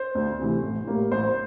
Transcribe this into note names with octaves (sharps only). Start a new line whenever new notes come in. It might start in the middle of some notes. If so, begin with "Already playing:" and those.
Already playing: C5
D2
C3 E3 A3
A1
A2 G3 A#3
A1 C5